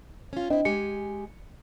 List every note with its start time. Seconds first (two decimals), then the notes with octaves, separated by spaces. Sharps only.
0.33 C#4 F4
0.50 C4 D4 E4 D#5
0.65 G#3 G4 G#5 C#7